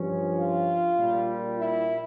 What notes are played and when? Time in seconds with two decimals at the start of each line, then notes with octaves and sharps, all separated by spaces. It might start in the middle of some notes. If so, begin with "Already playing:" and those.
Already playing: G2 F3 C#4
0.39 F4
0.97 A#1 A#2 G3
1.57 E4